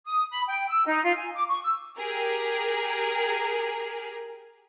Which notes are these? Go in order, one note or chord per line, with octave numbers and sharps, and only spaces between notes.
D#6
B5
G5
E6
D#4
F4
G#5
D6
C#6
E6
G4 G#4 A#4